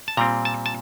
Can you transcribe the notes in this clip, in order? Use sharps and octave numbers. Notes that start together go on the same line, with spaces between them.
A5
A#2 G3 C4 A#5
A5
A5